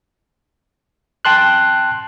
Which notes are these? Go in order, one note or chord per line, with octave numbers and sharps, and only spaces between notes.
G5 A5 C6 F#6